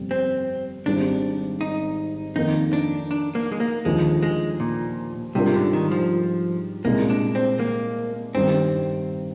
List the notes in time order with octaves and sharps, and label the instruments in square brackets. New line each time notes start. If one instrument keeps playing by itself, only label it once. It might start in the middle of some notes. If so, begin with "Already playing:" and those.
Already playing: [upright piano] G1 F2 C3 G3
[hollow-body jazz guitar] C4
[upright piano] G#1 G#2 G3 C4 G4 [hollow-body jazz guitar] D4
[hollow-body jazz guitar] D#4
[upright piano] F2 D#3 A#3 [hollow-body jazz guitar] D#4
[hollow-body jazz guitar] D4
D4
A#3
G#3
A#3
[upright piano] D#2 D3 F3 A#3 F4 [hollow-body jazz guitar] G#3
[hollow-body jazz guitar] G#3
A#2
[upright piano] G#2 G3 D4 F4 A#4 [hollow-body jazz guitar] C3
[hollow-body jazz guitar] C3
D3
D#3
F3
[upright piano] C2 A#2 G#3 [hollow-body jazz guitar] A#3
[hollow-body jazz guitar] D4
C4
A#3
[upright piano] G2 D#3 G3 [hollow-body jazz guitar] C4